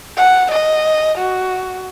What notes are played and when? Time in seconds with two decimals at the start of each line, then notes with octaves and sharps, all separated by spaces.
0.17 F#5
0.51 D#5
1.18 F#4